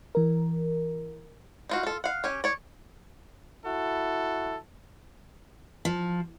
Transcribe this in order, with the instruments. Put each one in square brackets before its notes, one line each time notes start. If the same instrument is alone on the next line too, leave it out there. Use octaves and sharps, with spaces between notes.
[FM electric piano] E3 A#4
[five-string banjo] D#4 F4 F#4
F4 A4
F5 F#5
C#4 G4 G#5
C#5 D5
[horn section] E4 F#4 A4
[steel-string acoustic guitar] F3